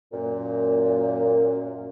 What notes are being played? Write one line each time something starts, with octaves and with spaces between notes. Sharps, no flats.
F#2 A#2